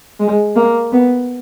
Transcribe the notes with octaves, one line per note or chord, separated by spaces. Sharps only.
G#3
A#3
B3